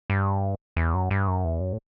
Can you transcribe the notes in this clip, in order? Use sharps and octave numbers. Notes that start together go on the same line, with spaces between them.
G2
E2
F#2
G2
F#2
E2
F#2
A2